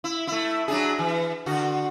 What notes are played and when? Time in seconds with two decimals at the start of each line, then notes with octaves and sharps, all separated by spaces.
0.04 E4
0.27 A3 E4
0.68 F#3 D4 G#4
0.99 E3
1.46 D3 F#4